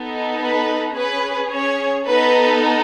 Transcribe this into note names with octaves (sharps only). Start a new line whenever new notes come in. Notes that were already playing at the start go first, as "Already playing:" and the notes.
Already playing: B3 D#4 A4
B4
C#4 G#4 B4
C#4 C#5
B3 D#4 A4 B4